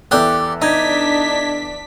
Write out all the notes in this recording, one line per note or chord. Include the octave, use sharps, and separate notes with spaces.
E2 G4 A4 D5 F#6
D4 D#4 D#5 G#6 B6